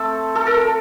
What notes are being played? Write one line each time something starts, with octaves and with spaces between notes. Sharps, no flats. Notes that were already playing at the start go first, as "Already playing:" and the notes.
Already playing: A3 C4 A4
A4
A#4
A4